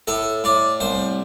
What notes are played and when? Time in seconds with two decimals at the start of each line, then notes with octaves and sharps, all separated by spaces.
0.07 A2 A4
0.44 A2 D5
0.80 C2 C5